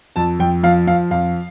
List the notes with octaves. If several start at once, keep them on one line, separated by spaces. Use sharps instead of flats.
F2 A5
F2 G5
F3 F5
F3 F5
F2 F5